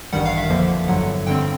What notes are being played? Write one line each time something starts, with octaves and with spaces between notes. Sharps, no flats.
A1 G2 D#3 G3 F#5
F5
E5
F2 D3 F3 A#3
G1 G2 D3 F#3 F#5
G2 D3 G3 C4 G5